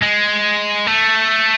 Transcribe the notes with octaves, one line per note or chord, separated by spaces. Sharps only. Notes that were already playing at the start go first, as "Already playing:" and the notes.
G#3
A3